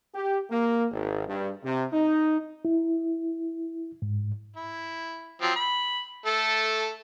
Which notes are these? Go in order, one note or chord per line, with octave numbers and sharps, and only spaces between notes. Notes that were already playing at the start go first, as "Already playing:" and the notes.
G4
A#3
G#1
G2
C3
D#4
E4
G#2
E4
F3 F#3 C4
B5
A3 A4